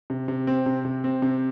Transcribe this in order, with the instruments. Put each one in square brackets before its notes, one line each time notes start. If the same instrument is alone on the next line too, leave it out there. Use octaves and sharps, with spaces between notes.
[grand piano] C3
C3
C4
C3
C3
C4
C3